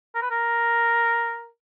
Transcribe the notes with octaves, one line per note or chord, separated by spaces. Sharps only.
A#4
B4
A#4